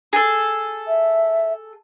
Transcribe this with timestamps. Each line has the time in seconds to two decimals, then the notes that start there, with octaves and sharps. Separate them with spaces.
0.13 G#4 A4
0.88 E5